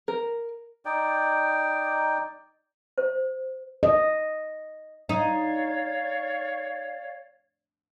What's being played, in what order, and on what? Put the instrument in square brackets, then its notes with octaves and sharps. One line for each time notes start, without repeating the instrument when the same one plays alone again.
[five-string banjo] A#4
[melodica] D#4 D5 G5
[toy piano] C5
[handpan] D#5
[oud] D#4 [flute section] C#5 D5 F5